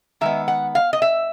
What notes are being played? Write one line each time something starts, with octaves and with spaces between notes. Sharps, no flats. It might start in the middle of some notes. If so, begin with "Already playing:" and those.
D#3 G#3 B3 E5
F#5
F5
D#5
E5